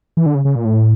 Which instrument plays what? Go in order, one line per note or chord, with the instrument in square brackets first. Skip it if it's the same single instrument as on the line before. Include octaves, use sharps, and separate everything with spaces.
[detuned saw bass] E3
D3
C#3
C#3
A#2
A2